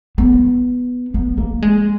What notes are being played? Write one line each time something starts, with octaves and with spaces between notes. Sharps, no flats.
B3
B3
A#3
G#3